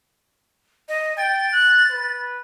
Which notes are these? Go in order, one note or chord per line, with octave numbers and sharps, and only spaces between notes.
D#5
G5 A6
F#6
B4